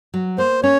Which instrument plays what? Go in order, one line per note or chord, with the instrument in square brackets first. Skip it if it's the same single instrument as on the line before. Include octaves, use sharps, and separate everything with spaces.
[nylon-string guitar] F#3
[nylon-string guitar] A#3 [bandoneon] C5
[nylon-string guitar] C#4 [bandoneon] C#5